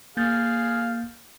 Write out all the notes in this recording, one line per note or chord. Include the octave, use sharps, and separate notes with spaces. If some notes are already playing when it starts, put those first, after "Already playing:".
A#3 G#4 F5 G6 A6